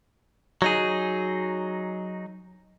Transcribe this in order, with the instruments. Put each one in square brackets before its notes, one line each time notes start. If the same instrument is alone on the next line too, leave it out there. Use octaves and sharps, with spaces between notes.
[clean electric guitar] F#3 D#4 G#4